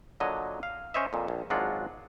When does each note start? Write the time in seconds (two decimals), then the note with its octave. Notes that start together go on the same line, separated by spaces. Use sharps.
0.20 A#2 D3 F#3 C#5 D#5
0.63 F5
0.94 C#4 C5 C#5 D#5 E5
1.13 F2 A#2
1.28 A#1
1.50 G#1 F#3 G#3 D4 F4 F#5